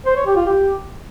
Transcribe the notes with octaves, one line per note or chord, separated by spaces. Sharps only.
C5
C#5
G4
F4
G4